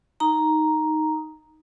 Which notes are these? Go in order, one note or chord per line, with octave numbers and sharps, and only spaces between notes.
D#4 A#5